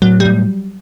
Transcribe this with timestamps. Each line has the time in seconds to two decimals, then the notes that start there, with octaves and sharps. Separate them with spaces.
0.02 A2 F#3
0.20 G3
0.25 A2